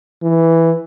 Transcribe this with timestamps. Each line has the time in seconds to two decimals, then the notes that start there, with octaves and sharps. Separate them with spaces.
0.23 E3